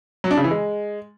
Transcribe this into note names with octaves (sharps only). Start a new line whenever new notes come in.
F#3
D4
C#3
E3
G#3